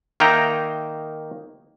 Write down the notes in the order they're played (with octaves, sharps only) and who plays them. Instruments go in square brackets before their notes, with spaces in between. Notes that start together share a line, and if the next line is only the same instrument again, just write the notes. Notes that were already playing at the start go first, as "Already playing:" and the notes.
[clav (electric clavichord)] D#3 A#3 D#4 E5 G5 A#5